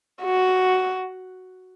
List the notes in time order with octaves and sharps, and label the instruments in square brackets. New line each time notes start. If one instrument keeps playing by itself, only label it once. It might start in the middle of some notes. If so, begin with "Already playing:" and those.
[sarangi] F#4